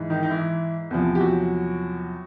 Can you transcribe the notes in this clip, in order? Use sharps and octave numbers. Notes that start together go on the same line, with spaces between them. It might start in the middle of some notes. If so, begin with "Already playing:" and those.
Already playing: G#2 E3
D#3 D#4
D#4
E3 E4
E2 C3 F3
G4
F#3 F#4